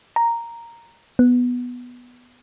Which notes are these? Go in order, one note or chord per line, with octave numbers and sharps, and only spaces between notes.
A#5
B3